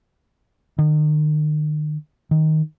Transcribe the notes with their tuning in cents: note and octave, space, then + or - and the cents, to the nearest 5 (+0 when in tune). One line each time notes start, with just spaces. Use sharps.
D#3 -45
D#3 +5